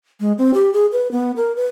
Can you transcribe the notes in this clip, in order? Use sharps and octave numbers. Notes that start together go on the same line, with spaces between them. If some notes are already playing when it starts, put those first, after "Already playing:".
G#3
C4
G4
G#4
B4
B3
A#4
B4